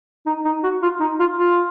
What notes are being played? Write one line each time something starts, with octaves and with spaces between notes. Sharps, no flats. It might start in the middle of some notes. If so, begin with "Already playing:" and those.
D#4
D#4
F#4
F4
D#4
F4
F4